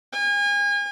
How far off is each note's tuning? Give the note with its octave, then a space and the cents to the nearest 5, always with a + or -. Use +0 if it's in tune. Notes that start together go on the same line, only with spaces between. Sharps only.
G#5 -35